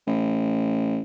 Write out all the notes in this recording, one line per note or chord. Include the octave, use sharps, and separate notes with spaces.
A1